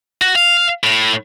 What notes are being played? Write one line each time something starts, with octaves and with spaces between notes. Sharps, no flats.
F#4
F5
A2